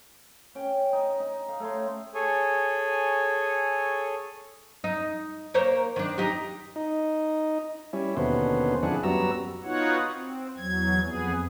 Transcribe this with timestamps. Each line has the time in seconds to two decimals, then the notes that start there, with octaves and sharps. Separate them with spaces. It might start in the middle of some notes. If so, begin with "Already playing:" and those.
0.55 C#4 G5
0.93 D#4
1.20 D#4
1.48 F5
1.60 A3 C#5 C6
2.14 G#4 A4 C#5 G#5
4.84 D#4
5.54 A#3 C5 C#5
5.96 D#3 D4
6.18 D#4 G4
6.76 D#4
7.93 G3 C#4 E4
8.17 D#2 B2 D3 B3 C#4 C5
8.83 F2 D3 D4 E4 G#4 F#5
9.03 F#2 G3 B3 F#4 A#5 E6
9.64 B3 D#4 F4 F#4 C#5 F#5
10.12 C4
10.57 E2 F#3 G#6
11.01 F2 B3 G#4